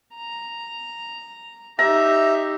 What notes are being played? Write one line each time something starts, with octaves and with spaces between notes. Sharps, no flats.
A#5
D#4 G4 E5 A#5